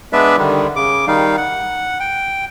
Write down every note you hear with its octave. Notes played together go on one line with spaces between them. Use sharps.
G#3 B3 D4 B4 D5 E5
D3 D#3 G3
C#3 D6
D#3 G3 D#4 F5
F#5
G5